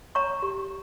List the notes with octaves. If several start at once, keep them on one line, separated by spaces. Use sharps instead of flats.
C#5 A#5 C#6
G4